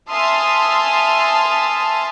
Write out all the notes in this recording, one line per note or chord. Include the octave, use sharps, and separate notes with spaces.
E5 G#5 A5 C6 D#6 F6